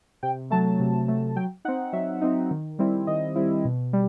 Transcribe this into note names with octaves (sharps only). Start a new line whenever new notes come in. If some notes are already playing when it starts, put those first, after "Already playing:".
C3 G5
F#3 A3 A5
C3
F#3 A3
F#3 G5
C4 D#4 F#5
F#3 E5
C4 D#4
D#3
G3 C4 E4
D#3 D#5
G3 C4 E4
B2
G3